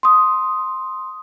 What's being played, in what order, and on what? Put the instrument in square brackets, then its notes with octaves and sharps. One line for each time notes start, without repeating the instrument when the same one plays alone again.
[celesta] C6 D#6